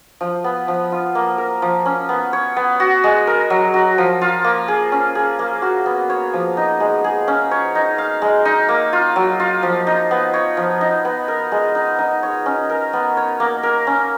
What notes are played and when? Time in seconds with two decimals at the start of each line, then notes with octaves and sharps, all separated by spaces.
0.21 F3
0.44 B3
0.68 F3
0.92 F4
1.15 A#3
1.38 A#4
1.62 F3
1.86 C#4
2.09 B3
2.33 C#5
2.56 B3
2.80 F#4
3.04 G#3
3.27 A#4
3.50 F#3
3.74 F#4
3.98 F3
4.21 F4
4.44 A#3
4.68 G#4
4.92 C#4
5.15 G#4
5.39 A#3
5.62 F#4
5.86 B3
6.10 C#5
6.33 F3
6.57 D#4
6.80 G#3
7.04 G#4
7.28 C#4
7.51 C#5
7.75 D#4
7.98 F5
8.22 G#3
8.45 D#4
8.69 A#3
8.93 F4
9.16 F#3
9.40 F4
9.63 F3
9.87 D#4
10.11 B3
10.34 C#5
10.57 F3
10.81 D#4
11.05 B3
11.28 A#4
11.52 G#3
11.75 D#4
11.99 D#4
12.23 C#5
12.46 C#4
12.70 A#4
12.93 B3
13.17 C#5
13.40 A#3
13.63 A#4
13.87 C#4